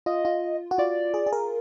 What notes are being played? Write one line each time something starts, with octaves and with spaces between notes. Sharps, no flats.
F4 D#5
F4
F#4
F4 D5
G#4
G#4
A#4